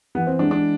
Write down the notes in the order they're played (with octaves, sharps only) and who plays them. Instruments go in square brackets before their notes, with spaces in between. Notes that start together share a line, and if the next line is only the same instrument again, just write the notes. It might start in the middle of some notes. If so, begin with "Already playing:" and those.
[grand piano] E3 [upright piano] B3
[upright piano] C4
[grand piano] G#3 B3 D#4 [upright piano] D4
[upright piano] D4